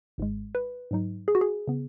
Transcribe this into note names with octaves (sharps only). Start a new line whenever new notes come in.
G#1 G#2 G#3
B4
G#2 F#3 D#4
G#4
F#4
G#4
C#3 B3